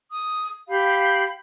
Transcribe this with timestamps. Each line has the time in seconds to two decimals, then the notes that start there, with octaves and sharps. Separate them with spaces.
0.10 D#6
0.69 G4 F5 B5 G6